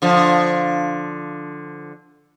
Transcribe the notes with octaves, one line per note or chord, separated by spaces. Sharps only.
D3 F3